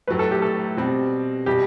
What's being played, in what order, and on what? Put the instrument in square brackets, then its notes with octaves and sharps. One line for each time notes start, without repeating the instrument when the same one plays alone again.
[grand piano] A2 F#3 A3 [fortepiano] B4
[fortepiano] A4
G4
A4
[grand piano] B2 G3 C4
[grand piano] B2 G3 [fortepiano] G4